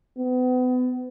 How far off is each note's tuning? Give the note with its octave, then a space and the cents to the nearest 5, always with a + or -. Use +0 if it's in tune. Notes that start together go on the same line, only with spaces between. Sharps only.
B3 +35